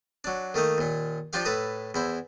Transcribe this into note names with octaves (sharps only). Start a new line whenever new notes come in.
F#3 D4
D#3 A3 A#3 D#4
D#2 A#2
F3 D4 F4 G4 F5
A2 A4 B4 A#5 D#6
E2 E4 C5